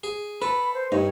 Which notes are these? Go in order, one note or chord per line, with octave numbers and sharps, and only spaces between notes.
G#4
A4 B4 B5
C5
G2 D#4 C#5